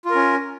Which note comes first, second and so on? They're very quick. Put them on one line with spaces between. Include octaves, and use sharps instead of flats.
F4 A#4 C#4